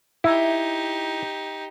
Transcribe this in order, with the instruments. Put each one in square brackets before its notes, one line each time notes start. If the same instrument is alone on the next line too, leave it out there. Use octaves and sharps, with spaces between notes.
[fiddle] D#4 G4 [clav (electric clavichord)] E4